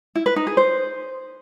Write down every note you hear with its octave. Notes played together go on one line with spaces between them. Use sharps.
E4
B4
D#4
G#4
C5